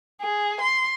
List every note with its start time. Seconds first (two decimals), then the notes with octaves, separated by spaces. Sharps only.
0.21 G#4
0.61 C6